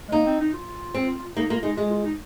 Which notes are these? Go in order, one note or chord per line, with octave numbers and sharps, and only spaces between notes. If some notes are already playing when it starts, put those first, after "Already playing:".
G#3
A#3 D#4
C4
D#4
F4
C4
A#3 D#4
A#3 F4
G#3 D#4
G#3 F4
F4
D#4